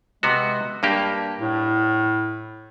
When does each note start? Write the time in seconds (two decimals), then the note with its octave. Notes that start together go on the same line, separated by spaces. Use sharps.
0.23 C3 G#3 B3 F#4
0.83 G2 A#3 D4 G4
1.40 A2